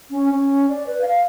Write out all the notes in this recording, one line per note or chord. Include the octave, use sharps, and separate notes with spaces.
C#4
C#4
D5
B4
F5